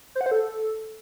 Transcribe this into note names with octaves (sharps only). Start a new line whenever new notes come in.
C5
F#5
C5
A4